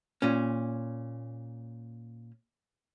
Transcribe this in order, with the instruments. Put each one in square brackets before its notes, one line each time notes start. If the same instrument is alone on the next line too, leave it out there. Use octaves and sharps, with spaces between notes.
[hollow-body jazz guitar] A#2 C#4